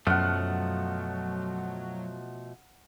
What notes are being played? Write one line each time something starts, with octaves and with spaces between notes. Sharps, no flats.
F#2 B2 F3 F#3 A3 C#4 F5 F#5